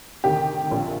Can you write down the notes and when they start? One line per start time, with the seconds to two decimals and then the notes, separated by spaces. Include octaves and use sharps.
0.24 D2 C3 D#3 G4
0.71 A#1 A#2 F3